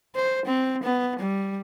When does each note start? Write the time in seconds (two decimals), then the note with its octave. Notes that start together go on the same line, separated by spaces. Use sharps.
0.16 C5
0.46 C4
0.83 B3
1.19 G3